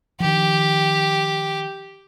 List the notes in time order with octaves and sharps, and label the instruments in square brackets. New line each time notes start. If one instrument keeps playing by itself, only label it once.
[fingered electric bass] D#3 F3 [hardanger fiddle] G4